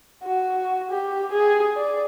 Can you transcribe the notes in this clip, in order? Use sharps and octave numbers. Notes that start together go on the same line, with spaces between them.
F#4
G4
G#4
D5